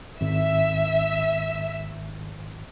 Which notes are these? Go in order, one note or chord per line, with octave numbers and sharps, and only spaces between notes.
G#1 E5